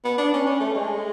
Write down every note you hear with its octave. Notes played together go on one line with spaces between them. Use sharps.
B3
D4
C#4
C#4
A3
G#3